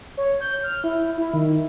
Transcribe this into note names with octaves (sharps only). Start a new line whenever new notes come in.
C#5
G6
F6
E4
E4
D#3